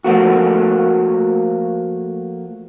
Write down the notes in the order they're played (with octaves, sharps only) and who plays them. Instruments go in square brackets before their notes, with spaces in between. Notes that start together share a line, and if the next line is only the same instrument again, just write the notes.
[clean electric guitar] F3 A3 A#3 F#4